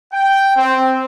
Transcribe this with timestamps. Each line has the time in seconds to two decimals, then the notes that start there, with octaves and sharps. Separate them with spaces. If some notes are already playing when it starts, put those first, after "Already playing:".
0.13 G5
0.55 C4